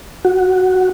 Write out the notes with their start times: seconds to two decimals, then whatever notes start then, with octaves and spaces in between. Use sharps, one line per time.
0.25 F#4